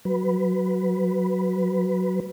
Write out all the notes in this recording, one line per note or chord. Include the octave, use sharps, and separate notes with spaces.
F#3 B4